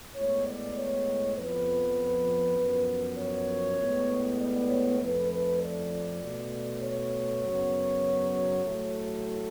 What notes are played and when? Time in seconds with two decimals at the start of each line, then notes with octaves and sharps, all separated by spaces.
0.15 A2 G#3 B3 C#5
0.46 D5
0.76 C#5
1.36 F2 F3 B3 B4
2.57 F#2 F3 B3
3.18 C#5
3.78 A2 G#3 B3
4.38 D5
4.68 C#5
4.99 F2 F3 A3 B4
5.29 B4
5.59 D5
6.20 B2 A3
6.80 C#5
7.41 F#2 C#3 F#3 B3
8.62 A2 F#3 A3